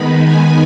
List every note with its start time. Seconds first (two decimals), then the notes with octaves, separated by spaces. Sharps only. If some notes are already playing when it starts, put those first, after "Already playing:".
Already playing: D#3 G#3 B3 D#4 B5
0.23 G#5